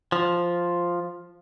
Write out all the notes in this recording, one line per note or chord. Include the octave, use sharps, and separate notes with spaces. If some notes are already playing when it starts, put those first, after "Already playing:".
F3